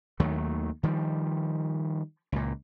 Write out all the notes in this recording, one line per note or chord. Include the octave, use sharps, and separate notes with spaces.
D#2 D#3 F#3 A3
D#3 F3 G3
C#2 A#2